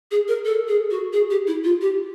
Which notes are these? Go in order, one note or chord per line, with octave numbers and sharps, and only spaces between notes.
G#4
A#4
A4
G#4
F#4
G#4
G4
E4
F4
G4